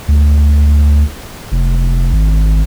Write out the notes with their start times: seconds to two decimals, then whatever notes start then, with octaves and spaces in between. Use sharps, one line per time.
0.08 D2
1.52 F1
2.13 G#1